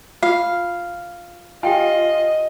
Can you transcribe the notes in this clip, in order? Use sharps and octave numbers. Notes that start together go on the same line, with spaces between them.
F4 F5
F4 G4 D#5 G5 G#5